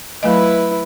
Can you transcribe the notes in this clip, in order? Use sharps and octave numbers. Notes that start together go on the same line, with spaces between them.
F#3 A3 E4 B4 D#5